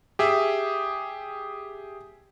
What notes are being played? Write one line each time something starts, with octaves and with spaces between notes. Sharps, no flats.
G4 G#4 E5